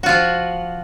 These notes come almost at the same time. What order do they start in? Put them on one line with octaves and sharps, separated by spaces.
F#4 F4 F3